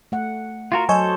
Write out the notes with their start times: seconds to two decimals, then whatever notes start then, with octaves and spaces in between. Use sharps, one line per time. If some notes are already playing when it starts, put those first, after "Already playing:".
0.12 A3 F#5
0.72 F4 F#4 A#4
0.89 F#3 A4 C5 D#5 G#5 C#6